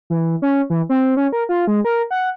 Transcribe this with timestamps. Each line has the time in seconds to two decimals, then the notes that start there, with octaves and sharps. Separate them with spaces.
0.10 E3
0.42 C#4
0.70 E3
0.89 C4
1.17 C#4
1.32 A#4
1.49 F4
1.67 G#3
1.85 A#4
2.11 F#5